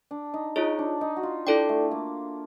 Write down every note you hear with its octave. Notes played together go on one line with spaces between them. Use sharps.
D4
D#4
D#4 F4 G#4 C#5
D4
D#4
F#4
F4
D4 E4 A4 D5 G5
A3
A#3